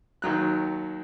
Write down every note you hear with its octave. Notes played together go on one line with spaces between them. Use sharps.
D#2 D#3 F#3 F#6